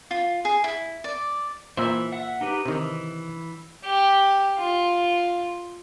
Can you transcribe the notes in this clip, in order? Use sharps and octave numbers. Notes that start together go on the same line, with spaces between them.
F4
G#4
E4
D5
A#2 E3 C5 E5 E6
E5 F#5
D#4 G4 B4
C3 D#3 E3
G4
F4